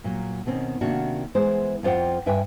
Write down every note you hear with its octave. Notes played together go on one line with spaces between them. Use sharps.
A#2 F#3
B2 D#3 C4 C#4
C3 D#3 A#3 D4 F#4
E3 G#3 B3 C5
F2 F4 C5 F#5 G5
G2 B4 E5 G5 G#5